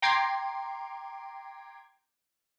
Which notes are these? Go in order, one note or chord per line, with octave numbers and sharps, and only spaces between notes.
G5 A#5 C6 D6 G#6 C7